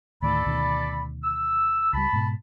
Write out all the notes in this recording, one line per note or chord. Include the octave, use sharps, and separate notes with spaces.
D2 A2 D#3 A4 D5 B5
D2 B2 D#3
E6
C#2 G3 A5 B5
G#2 B2